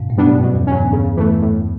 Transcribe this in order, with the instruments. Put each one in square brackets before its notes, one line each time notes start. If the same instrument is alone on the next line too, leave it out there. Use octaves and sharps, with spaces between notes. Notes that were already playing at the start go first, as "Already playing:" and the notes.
Already playing: [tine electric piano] G2 B2
F#2 A2
[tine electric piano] B2 [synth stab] G3 B3 D4
[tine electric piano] F#2 A2
[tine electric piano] F#2 [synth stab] B2
[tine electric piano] E2
[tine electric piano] F#2 [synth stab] F#3 C#4
[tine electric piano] E2 G2
[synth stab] C#3
E3 A3
A2